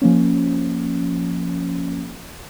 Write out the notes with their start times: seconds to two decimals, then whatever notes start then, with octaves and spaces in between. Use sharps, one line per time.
0.02 F3 A#3 C#4